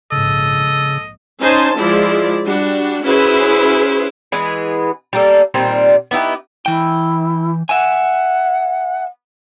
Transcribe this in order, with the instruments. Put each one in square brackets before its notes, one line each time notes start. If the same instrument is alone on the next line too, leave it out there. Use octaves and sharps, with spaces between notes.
[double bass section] A#1 G#2 [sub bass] C#3 [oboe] A4 [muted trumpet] D#5
[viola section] C#4 D#4 C5 G#5 A5
F3 G#3 E4 D5
G3 D4 F#4
C#4 E4 F#4 G#4 B4 C5
[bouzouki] E3 G#3 B3 G#4
G3 A#3 A4
A#2 D#3 G3 C4
B3 D#4 E4 G4
[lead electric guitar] E3 G5 [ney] E4
[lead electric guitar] E5 G#5 [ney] F#5